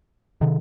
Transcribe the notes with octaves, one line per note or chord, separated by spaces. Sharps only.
C3 D#3